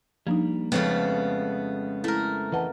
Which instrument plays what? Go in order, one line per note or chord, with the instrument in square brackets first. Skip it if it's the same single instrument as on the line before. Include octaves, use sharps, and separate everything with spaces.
[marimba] F3 D4 D#4 [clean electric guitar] G3 A#3
[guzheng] F2 C#3 A3 [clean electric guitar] G#3 C#4 [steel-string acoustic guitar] B3
[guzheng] A3 A#4 [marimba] E4
[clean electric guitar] E3 D#5 [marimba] B4 F#5 A5